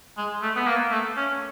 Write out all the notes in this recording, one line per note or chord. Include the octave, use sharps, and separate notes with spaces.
G#3
A3
B3
A#3
A3
C#4